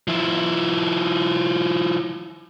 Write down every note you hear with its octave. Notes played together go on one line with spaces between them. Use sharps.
F3 E4